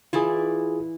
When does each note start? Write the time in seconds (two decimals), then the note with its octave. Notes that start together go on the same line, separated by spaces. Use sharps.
0.13 E3 E4 F4 G#4 D5